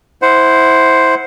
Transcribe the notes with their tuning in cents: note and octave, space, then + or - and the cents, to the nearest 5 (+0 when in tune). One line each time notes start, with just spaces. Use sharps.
E4 -20 C5 +0 F#5 +0